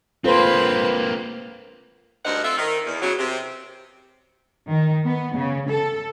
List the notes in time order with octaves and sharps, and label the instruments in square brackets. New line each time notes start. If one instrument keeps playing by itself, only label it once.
[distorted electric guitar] A#3 C4 [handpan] F4 A4 C5 [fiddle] B4
[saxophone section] D2 G2 D#4 A#4 C5 F#5
C4 F4 A4 E5
D#3
E2
C#3 F#3
C3
[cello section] D#3
B3
C#3
A4